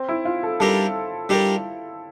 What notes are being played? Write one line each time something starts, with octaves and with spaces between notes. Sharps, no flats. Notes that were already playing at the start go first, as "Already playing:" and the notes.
Already playing: C4
E4
F4
A4
G3 D4 G4 A4 A#4
G3 D4 G4 A#4